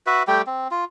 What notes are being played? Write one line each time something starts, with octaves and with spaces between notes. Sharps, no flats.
F#4 B4 E5
G3 A3 G4 G5
C4
F4